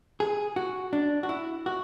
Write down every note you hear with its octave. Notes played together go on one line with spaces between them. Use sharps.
G#4
F#4
D4
F#4
E4
F#4